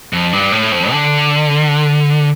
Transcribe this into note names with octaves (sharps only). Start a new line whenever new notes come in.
F2
G2
A2
F2
D3